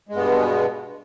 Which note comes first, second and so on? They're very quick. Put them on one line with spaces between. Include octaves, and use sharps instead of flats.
G#3 G2 B3 B2